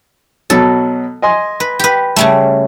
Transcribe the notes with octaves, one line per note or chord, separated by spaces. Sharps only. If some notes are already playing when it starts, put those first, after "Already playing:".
B2 F#3 A4
D#5 G#5 C6
B4
G4 B4
C#3 G3 A3